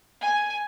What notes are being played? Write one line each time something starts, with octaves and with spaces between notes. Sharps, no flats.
G#5